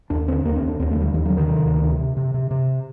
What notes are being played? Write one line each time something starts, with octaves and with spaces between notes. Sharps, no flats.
D#2 D4
D3 C4
D#2 A#3
C4
D#2
D4
D#2 C4
A3
D3
G3
D#2 D#3
F#3
D3
D#3
C3 D#3
D2
C3
C3
C3
C3
C3